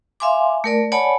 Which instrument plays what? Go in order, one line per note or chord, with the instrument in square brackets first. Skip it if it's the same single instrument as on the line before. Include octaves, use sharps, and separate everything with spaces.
[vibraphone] E5 F5 G#5 C6 D6
A3 A#4 D5
C#5 D5 F#5 G#5 A5 B5